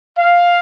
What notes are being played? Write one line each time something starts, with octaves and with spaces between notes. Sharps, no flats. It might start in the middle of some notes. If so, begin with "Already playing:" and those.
F5